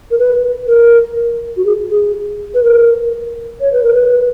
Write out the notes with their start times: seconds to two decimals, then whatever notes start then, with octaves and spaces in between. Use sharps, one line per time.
0.11 A#4
0.18 B4
0.68 A#4
1.56 F#4
1.65 G#4
1.90 G#4
2.54 B4
2.63 A#4
3.60 C#5
3.72 B4
3.83 A#4
3.94 B4